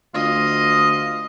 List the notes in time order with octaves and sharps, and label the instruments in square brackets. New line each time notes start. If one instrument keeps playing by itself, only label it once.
[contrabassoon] D2 [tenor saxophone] F4 [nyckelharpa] D#5